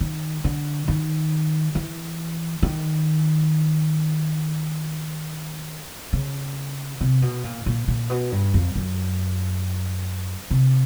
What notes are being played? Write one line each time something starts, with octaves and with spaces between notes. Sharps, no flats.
D#3
D3
D#3
E3
D#3
C#3
C3
B2
A#2
A#2
A#2
B2
G2
F2
F#2
C3